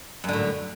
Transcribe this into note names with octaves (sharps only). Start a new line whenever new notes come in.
F#2 A2 D3